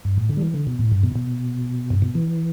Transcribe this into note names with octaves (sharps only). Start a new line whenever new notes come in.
G2
A2
D3
G3
E3
D3
B2
A2
G2
B2
B2
G2
B2
E3